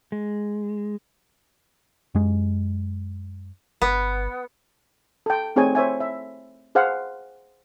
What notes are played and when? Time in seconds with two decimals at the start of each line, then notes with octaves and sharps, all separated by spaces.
0.12 G#3
2.15 F#2 G#3
3.82 G1 B3
5.26 A4 G5
5.56 A3 C4 D#4 G#4 C#5 G#5
5.75 C5 C#5 E5 G#5
6.01 E5
6.75 G#4 C5 F5 F#5